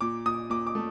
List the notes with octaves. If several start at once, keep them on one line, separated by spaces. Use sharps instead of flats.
A#2 D6
A#2 D#6
A#2 D6
D6
A3